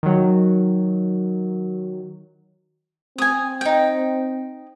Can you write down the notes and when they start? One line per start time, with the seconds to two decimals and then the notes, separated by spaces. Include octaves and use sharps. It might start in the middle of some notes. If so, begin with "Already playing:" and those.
0.03 D#3 F#3
3.18 C4 G#5 D#6
3.61 D#4 G5